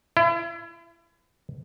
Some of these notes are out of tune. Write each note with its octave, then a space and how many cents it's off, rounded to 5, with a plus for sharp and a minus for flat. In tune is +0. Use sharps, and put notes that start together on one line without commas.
E4 +35